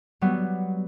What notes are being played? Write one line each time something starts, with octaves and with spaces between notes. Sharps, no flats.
F#3 G3 B3